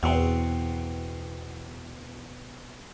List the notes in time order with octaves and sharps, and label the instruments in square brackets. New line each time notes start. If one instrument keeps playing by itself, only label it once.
[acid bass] E2 [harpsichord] B2 C4